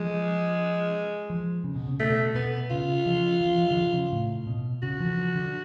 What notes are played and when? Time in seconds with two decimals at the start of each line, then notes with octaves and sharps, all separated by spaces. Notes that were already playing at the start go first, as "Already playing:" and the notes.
Already playing: F3 G#3
1.30 F3
1.64 C#3
1.75 B2
1.87 C#3
2.00 B2 A3
2.35 B2 B3
2.70 C#3 F4
3.06 F3
3.41 F3
3.58 F3
3.71 D3
3.77 F3
3.94 C#3
4.12 A2
4.47 B2
4.82 C#3 F#4
5.00 F3
5.18 F3
5.35 D3